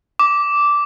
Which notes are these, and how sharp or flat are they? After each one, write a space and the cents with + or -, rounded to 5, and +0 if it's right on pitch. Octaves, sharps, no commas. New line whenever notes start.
D6 -10